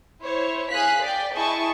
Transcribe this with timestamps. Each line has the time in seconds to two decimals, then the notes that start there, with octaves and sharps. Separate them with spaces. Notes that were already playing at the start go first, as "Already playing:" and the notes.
0.22 E4 C5 C#5
0.71 G#4 F5 F#6 B6
1.03 D5 G5
1.37 E4 G#4 D#5 A5 C#6